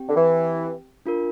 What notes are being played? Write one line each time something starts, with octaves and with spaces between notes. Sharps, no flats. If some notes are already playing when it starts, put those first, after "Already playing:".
Already playing: C4 G4 G5
D3
E3
D4 F4 A#4